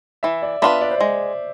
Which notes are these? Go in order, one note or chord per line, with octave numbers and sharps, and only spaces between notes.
E3 E5
D5
B3 D4 F4 B4 E5
D5
C5
G#3 D5